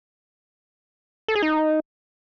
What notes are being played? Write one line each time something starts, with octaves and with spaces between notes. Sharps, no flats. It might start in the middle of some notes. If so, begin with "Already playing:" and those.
A4
G#4
D#4